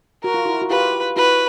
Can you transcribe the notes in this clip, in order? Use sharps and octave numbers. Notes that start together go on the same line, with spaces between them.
F#4 A#4
F4
E4 F#4
F#4
F4 G4 B4
E4 F#4 B4